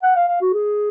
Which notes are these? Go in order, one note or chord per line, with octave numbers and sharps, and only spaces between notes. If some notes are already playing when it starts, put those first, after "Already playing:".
F#5
F5
F5
F#4
G#4